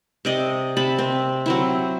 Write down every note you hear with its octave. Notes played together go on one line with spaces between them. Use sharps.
C3 D5 D#5
C3 A5 B5
C4
F#3 C4 E4